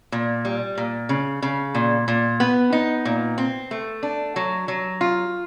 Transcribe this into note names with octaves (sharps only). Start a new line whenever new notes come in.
A#2
G3
A#2
C#3
C#3
A#2
A#2
B3
D#4
A#2
C4
A3
D4
F#3
F#3
F4